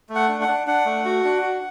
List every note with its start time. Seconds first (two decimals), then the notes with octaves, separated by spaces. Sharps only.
0.09 A3
0.15 F#5
0.28 D4
0.41 F#5
0.48 D4
0.67 D4 F#5
0.86 A3
1.05 F#4
1.24 D4
1.42 F#4